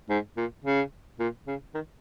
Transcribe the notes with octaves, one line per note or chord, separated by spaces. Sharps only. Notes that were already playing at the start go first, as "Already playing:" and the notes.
G#2
A#2
C#3
A#2
C#3
D#3